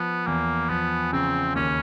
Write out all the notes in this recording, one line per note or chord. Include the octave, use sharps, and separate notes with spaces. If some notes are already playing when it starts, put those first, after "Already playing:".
Already playing: F3 B3
E2 A#3
F3 B3
C#3 C4
D#2 C#4